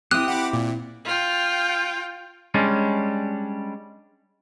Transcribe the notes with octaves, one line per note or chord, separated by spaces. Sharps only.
C4 E4 G4 D#6 F#6
F#5 B5 D6
A#2
F4 G5
G3 G#3 C#4 D4